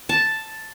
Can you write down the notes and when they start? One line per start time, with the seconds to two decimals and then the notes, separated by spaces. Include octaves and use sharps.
0.09 A5